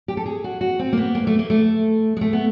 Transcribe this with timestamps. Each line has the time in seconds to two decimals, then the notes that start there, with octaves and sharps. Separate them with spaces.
0.08 G4
0.17 A4
0.26 G#4
0.44 F#4
0.61 F#4
0.79 C4
0.93 A#3
0.97 B3
1.15 A#3
1.27 A3
1.39 A#3
1.50 A3
2.17 G#3
2.21 A3
2.33 B3